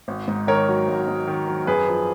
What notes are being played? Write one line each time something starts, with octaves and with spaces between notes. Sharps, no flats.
G#1
G#2
D#3 A#4 C#5
F#3
G#1
G#2
D#3
F#3
F#2 G#4 B4
F3